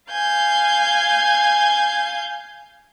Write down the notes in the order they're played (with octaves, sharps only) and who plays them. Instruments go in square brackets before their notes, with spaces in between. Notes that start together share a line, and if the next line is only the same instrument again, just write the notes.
[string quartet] F5 G#5 G6